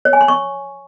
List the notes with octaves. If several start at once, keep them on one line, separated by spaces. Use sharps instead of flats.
C#5
G#5
C6
C#6